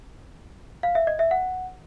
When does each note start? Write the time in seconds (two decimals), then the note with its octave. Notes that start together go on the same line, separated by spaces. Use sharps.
0.83 F5
0.95 E5
1.07 D#5
1.19 E5
1.31 F#5